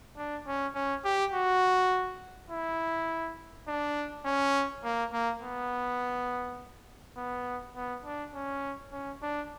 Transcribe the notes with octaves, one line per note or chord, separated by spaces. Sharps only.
D4
C#4
C#4
G4
F#4
E4
D4
C#4
A#3
A#3
B3
B3
B3
D4
C#4
C#4
D4